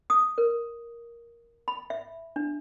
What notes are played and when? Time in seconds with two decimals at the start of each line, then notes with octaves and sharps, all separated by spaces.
0.10 D#6
0.38 A#4
1.68 B5
1.90 E5
2.36 D4